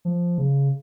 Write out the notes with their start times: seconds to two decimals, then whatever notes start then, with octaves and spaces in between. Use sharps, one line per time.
0.05 F3
0.38 C#3